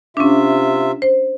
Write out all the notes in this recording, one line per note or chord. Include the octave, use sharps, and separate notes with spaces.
C3 C#4 D4 F4 E5
C5